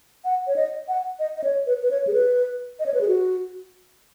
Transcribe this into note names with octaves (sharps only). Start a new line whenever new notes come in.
F#5
C#5
D#5
F#5
D#5
D#5
C#5
B4
B4
C#5
G#4
B4
D#5
C#5
B4
G#4
F#4